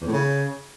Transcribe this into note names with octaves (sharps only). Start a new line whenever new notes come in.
E2
A2
C#3